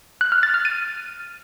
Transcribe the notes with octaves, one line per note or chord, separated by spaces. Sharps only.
F#6
F6
A6
F6
D#7